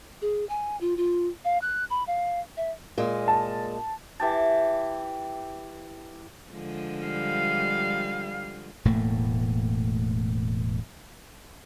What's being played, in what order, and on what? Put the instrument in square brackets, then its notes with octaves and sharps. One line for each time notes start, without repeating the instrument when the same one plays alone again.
[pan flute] G#4
G#5
F4
F4
F5
F#6
B5
F5
E5
[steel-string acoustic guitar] A#2 G#3
[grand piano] A5
[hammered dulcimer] E3 G4 A5
[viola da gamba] D3 F3 G#3
[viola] G3 F5
[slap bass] E1 A2 A3 A#3